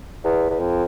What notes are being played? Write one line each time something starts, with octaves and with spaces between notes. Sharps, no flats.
E2
E2
F2